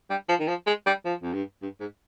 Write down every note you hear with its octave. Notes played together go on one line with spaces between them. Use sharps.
G3
F3
D#3
F3
G#3
G3
F3
F2
G2
G2
G#2